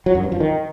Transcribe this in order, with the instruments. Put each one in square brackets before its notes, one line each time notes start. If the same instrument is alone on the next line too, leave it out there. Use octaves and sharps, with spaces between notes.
[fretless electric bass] F#3
F#2
G2
F3
D#3